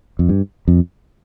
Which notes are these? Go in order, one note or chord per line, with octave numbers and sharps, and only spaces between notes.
F2
G2
F2